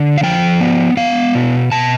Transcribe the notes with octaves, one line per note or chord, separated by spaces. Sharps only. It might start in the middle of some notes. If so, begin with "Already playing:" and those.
Already playing: D3
F5
F3 G5
B3
B3 F5
B2
B2 A5